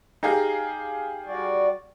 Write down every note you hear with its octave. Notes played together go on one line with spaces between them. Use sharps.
D#4 G4 G#4 F5
G3 F#4 D5